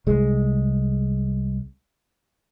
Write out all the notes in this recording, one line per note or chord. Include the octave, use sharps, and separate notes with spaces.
C2 G#3